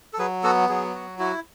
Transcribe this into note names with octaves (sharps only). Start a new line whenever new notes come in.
A4
F#3 G#4 B4
B3 F#4 A4
F#3 G#4
F#4
E4 F#4